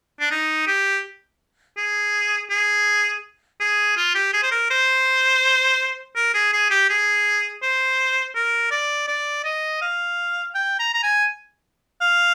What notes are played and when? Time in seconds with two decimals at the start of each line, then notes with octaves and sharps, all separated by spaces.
0.20 D4
0.31 D#4
0.67 G4
1.77 G#4
2.50 G#4
3.60 G#4
3.97 F4
4.15 G4
4.33 G#4
4.43 C5
4.51 A#4
4.70 C5
6.16 A#4
6.34 G#4
6.53 G#4
6.70 G4
6.90 G#4
7.62 C5
8.35 A#4
8.71 D5
9.08 D5
9.44 D#5
9.82 F5
10.55 G5
10.79 A#5
10.94 A#5
11.03 G#5
12.01 F5